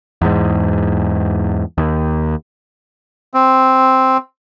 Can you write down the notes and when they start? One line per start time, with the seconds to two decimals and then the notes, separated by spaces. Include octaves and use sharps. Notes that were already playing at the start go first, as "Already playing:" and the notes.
0.22 E2 G#2
1.78 D#2
3.34 C4